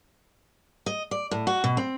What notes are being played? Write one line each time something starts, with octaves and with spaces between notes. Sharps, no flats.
D#5
D5
A2
F#4
B2
C4